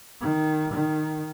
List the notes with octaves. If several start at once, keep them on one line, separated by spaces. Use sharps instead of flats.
D#3
D#3